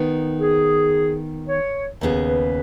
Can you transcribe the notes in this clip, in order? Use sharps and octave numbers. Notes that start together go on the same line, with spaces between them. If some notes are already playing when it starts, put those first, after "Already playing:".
Already playing: D#3 B3 D#4
G#4
C#5
D#2 C#3 B3 G#4
B4